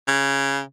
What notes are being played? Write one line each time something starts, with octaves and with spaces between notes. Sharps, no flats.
C#3